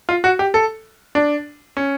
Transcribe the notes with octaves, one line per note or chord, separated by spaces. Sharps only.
F4
F#4
G4
A4
D4
C#4